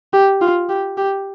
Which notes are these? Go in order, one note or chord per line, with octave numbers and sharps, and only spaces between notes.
G4
F4
G4
G4